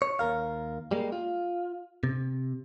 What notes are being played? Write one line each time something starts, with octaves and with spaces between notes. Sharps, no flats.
C#5
D#2 G#2 A#4 F5
G3 G#3 A#3
F4
C3